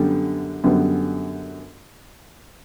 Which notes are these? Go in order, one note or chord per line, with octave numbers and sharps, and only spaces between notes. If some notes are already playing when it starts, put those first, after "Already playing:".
Already playing: F#2 D3 G3 B3
F#2 D3 G3 B3